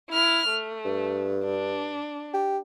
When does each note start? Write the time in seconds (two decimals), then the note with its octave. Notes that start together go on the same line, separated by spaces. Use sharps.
0.11 E4 F6
0.49 A3
0.85 G2
1.44 D4
2.33 G4